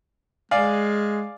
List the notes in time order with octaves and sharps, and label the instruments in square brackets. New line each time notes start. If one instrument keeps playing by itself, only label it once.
[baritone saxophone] G#3 [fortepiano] D5 F5 G#5